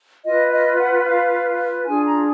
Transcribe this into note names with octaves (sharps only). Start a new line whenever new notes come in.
F4 B4 D#5
D#5
F#5
F#5
F5
D4 F4 G#4 G#5
A#5